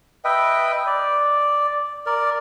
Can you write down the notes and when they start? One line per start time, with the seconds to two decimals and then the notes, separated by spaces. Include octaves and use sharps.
0.25 B4 D#5 E5 G5
0.87 D5
2.06 A#4 D5